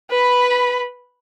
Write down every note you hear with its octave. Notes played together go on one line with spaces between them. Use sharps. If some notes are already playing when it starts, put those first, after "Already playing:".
B4 B5